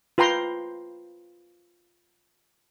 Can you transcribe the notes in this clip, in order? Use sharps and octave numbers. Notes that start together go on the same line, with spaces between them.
F4 B4 G5 A#5 C6